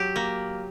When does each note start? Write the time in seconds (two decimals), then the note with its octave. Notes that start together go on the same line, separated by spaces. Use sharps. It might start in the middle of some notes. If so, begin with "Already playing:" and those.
Already playing: F#3 G4
0.16 A#3